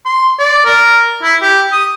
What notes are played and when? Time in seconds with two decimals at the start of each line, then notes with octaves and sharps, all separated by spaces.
0.06 C6
0.39 D5
0.65 A#4
1.23 E4
1.42 G4
1.73 D#6